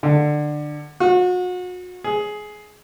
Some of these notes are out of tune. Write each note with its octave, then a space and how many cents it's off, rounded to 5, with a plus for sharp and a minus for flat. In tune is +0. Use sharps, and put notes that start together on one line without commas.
D3 +20
F#4 -35
G#4 +15